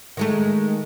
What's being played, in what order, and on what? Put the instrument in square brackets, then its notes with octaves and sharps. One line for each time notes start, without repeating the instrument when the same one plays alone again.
[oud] D#3 G#3 A3